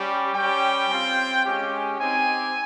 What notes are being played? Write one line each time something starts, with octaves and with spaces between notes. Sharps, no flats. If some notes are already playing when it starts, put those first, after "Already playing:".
Already playing: G3 C#4 G4
G3 C#4 G4 G5
C4 F4
G#3 C#4 G4
C4 D#4 G4 G#5